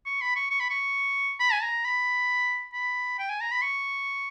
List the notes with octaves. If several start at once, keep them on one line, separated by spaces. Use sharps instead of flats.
C#6
B5
C#6
C#6
B5
C#6
B5
G#5
A#5
B5
B5
G5
G#5
A#5
B5
C#6